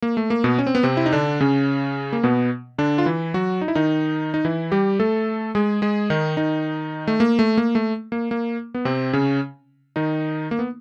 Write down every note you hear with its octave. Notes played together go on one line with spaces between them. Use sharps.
A#3
A3
A#3
B2 B3
C#4
C4
B3
C3 C4
E4
D#4
D3 D4
C#3 C#4
A#3
B2 B3
D3 D4
F4
E3 E4
F#3 F#4
D#4
E4
D#3 D#4
D#4
E3 E4
G3 G4
A3 A4
G#3 G#4
G#3 G#4
D#3 D#4
D#3 D#4
A3
A#3
A3
A#3
A3
A#3
A#3
B3
C3 C4
C#3 C#4
D#3 D#4
A#3
B3